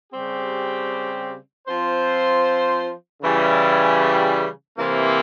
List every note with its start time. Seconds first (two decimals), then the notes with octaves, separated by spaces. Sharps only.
0.11 C#3 G3 C4 G4
1.67 F3 C4 F4 C5
3.23 C#3 E3 G3
4.78 C3 E3 A#3